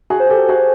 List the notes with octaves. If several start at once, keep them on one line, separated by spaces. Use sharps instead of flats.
F#4 G#4
C5
G4 A4
F#4 G#4